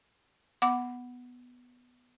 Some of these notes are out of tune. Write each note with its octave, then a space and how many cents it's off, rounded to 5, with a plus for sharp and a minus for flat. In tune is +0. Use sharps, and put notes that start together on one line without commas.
B3 +0 F#5 +0 D6 +0